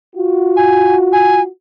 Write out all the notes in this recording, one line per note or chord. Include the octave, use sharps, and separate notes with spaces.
F4 F#4
G#5
G#5